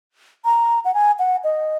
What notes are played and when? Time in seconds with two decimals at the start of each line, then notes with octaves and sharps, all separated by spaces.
0.45 A#5
0.85 F#5
0.94 G#5
1.19 F#5
1.44 D#5